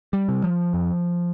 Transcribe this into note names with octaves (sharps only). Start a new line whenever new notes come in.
G3
C3
F3
F2